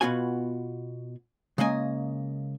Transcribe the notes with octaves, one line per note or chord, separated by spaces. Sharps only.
B2 B3 F4 F#4 G#5
C#3 G#3 A#3 D#5 G#5